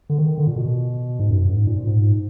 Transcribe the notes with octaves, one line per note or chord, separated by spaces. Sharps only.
D3
D#3
D3
A#2
B2
G#2
F#2
G#2
A#2
G#2